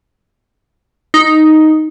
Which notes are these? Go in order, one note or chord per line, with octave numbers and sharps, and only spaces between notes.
D#4